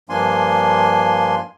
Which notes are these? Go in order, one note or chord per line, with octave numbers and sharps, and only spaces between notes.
G2 F3 A#3 D4 G#5 C6